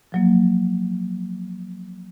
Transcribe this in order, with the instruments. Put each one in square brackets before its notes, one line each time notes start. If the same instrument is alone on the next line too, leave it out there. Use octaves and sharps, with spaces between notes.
[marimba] F3 F#3 A#3